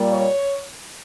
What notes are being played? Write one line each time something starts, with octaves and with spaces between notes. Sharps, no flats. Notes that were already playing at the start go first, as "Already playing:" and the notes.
Already playing: A#2 G3 A#3
C#5